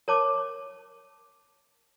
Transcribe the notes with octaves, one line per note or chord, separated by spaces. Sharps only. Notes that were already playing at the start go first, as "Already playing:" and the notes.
A#4 C#5 A5 D6